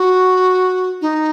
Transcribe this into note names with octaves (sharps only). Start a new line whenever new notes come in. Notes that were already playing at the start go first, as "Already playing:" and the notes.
Already playing: F#4
D#4